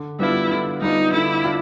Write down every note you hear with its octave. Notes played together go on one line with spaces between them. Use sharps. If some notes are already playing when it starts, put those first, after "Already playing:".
Already playing: D3
G3 B3 D4 E4 F4
D3
G3 B3 D4 D#4 F4
D3 E4
D4 F4